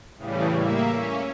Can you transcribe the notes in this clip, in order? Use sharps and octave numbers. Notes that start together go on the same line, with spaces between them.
A2 C#3 E3 G3
A#3 E5
C#4